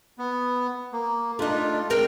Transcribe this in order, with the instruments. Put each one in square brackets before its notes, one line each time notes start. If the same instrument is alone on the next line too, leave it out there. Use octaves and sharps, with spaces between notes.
[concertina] B3
A#3
[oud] A3 D#4 [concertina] D4 F4
[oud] G#3 C4 A#4 [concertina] G5